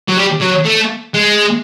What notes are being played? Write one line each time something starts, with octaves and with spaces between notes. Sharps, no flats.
F#3
G3
F#3
A3
G#3